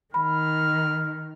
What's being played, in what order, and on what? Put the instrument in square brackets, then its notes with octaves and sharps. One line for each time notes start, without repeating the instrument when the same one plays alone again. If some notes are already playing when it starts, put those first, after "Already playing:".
[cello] D#3 [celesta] B5 [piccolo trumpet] F6